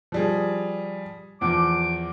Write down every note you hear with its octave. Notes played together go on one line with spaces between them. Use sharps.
F3 G3 G#4
E2 F3 D6